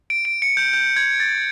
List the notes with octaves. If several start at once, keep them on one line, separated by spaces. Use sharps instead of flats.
D7
D7
C#7
G6
G6
G#6
A6